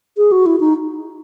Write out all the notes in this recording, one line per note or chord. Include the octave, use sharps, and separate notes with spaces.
G#4
F#4
E4
D#4